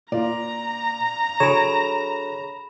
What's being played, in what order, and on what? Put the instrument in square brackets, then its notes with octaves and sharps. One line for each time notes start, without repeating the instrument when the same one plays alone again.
[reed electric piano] A#2 [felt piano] F4 D5 [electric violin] A#5
[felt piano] D3 F#3 D7 [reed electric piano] G#4 C#5 [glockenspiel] B5 E7